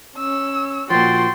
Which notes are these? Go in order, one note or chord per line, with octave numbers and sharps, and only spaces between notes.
C#4 E6
A#2 F3 F#4 G5 C6 A6